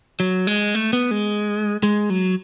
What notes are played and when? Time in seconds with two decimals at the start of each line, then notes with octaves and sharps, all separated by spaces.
0.20 F#3
0.47 G#3
0.75 A3
0.93 B3
1.11 G#3
1.83 G#3
2.10 F#3